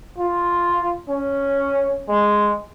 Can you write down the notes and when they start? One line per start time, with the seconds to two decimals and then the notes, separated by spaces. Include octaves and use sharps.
0.19 F4
1.09 C#4
2.09 G#3